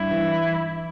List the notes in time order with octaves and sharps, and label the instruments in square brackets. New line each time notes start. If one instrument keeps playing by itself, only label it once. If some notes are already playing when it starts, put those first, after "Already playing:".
Already playing: [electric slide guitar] G2 [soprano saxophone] E4
[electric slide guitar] E3